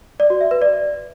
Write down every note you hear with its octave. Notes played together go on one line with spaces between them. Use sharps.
D5
F#4
E5
B4
D5